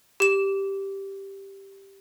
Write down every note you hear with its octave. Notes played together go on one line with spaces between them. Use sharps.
G4 E7